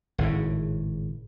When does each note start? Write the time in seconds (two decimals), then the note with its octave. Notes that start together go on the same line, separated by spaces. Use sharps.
0.18 G#1 A2 C#3